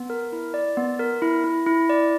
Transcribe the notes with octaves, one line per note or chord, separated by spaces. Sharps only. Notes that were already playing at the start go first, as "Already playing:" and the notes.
Already playing: B3
A#4
E4
D5
B3
A#4
E4
E4
E4
D5